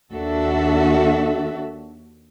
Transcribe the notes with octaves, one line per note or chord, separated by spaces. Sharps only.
D#2 D4 F#4 A4 E5